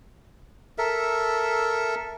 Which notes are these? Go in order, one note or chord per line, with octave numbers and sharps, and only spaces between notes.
A4 A#4 E5